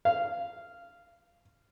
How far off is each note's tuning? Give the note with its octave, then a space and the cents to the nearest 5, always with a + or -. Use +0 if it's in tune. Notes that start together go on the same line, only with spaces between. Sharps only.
F5 -10